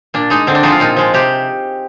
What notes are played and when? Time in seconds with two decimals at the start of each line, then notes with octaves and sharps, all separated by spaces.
0.14 A#2 D4
0.30 G#3 D#4
0.47 D3 C4
0.55 D4
0.63 F3 G#3 D#4
0.72 F4
0.80 A#2 D#4
0.96 F3 G#3
1.14 C3 G4